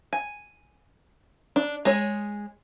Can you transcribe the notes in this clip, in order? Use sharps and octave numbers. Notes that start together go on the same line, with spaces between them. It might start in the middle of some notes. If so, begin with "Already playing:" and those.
G#5
D4
G#3 G#4 C#5